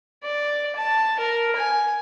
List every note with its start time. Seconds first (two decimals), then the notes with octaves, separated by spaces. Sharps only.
0.23 D5
0.76 A5
1.20 A#4
1.56 G#5